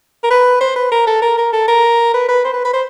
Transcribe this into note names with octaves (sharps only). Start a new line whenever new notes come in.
A#4
B4
C5
B4
A#4
A4
A#4
A#4
A4
A#4
B4
B4
C5
B4
B4
C5